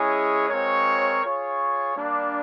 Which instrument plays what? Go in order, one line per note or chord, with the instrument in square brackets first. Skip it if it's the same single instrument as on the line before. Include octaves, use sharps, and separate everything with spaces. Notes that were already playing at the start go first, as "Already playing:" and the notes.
Already playing: [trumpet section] G#3 C#4 E4 G#4 C#5
G#3 C4 F4 A#4 C#5
F4 G#4 C#5
G3 A#3 D4